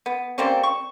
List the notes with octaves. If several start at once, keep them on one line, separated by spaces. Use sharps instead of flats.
B3
G3 A#3 C4 C#4
C#6